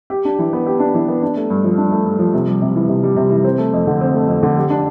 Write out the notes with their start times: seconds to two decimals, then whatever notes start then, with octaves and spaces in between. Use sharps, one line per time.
0.10 G4
0.25 D4
0.39 E3
0.53 B3
0.66 G4
0.80 D4
0.94 E3
1.08 B3
1.23 D4
1.36 A3
1.50 G2
1.64 F3
1.78 D4
1.91 A3
2.05 G2
2.19 F3
2.34 C3
2.47 G3
2.61 C3
2.76 E3
2.89 C3
3.03 G3
3.16 C3
3.30 E3
3.44 C4
3.58 A3
3.73 F2
3.87 D3
4.01 C4
4.14 A3
4.28 F2
4.43 D3
4.56 G4
4.70 D4